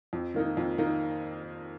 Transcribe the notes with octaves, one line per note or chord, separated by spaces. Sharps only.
F2
D#3 A#3 D#4
F2
D#3 A#3 D#4